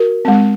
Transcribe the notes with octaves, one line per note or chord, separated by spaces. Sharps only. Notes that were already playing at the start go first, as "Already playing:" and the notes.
Already playing: F#4 A#4
G#3 C4